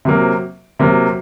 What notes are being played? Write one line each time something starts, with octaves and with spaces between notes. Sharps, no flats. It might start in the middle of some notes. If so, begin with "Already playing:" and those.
C3 F#3 A#3
C3 F#3 A#3